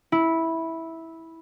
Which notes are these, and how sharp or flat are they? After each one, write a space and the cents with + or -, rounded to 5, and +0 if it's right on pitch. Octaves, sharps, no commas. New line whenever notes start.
E4 -10